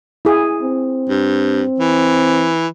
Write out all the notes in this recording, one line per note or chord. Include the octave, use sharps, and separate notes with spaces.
E4 G#4
C4
G2
E3